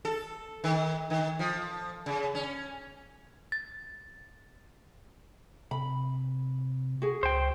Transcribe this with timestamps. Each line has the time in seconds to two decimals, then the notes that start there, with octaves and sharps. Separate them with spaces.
0.05 A4
0.64 D#3
1.10 D#3
1.39 F3
2.06 C#3
2.35 C#4
3.52 A6
5.71 C3 B5
7.02 F#4 G#4
7.23 C#2 C5 G5